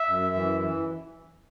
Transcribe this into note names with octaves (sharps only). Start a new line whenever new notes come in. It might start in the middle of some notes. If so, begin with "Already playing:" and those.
Already playing: E5
F#2
E3
E3